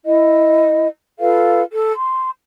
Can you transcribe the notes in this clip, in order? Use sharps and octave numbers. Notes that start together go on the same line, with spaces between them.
E4 D#5
F4 A4 B4 F5
A4
C6